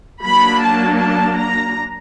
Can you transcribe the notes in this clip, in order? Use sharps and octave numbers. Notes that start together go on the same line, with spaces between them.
F#3 A#3 D4 B5
A5
A5
A#5